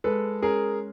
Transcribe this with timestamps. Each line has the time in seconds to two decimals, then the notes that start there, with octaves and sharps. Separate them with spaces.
0.04 G#3 A4 B4
0.42 C#4 G#4 A#4